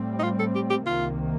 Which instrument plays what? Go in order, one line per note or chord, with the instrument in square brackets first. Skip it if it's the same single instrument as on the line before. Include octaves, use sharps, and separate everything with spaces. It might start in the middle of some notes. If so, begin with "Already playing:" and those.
Already playing: [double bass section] A2 G3 C4
[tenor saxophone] D#4
F4
A4
G4
G4
[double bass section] C2 C3 D#3 A#3 [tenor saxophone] F4